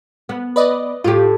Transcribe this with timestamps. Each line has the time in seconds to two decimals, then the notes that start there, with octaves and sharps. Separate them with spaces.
0.29 B3
0.56 B4 D5 D#5
1.04 A2 F4 G4